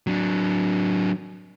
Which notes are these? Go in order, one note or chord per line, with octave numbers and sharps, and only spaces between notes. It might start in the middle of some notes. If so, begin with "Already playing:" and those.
F#3 D4